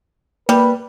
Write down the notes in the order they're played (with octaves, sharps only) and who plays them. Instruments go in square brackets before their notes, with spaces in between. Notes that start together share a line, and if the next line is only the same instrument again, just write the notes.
[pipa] G3 [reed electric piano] A#3 [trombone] B4